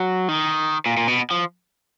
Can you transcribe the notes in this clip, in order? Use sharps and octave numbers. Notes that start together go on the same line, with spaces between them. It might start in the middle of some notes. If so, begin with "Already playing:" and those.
Already playing: F#3
D#3
A#2
A#2
B2
F3